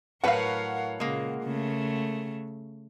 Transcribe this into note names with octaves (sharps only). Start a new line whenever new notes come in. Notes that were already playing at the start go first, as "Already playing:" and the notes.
A2 F#3 A#4 B4 C#5 F5 F#5
A#2 C#3 G#3 A#3
C#3 A3